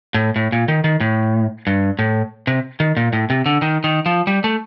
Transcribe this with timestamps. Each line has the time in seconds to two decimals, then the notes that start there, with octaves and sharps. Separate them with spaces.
0.14 A2
0.36 A2
0.52 A#2
0.68 D#3
0.84 D#3
1.00 A2
1.67 G2
1.99 A2
2.47 C3
2.80 D#3
2.97 A#2
3.13 A2
3.30 C3
3.46 D3
3.62 D#3
3.84 D#3
4.06 F3
4.27 G3
4.44 A3